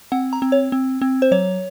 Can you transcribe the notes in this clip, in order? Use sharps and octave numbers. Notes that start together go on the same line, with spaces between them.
C4 F#5
A#5
C4
C#5
C4
C4
C5
F#3 C#5